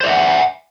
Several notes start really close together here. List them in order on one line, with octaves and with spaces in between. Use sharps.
C5 D5 E5 F#5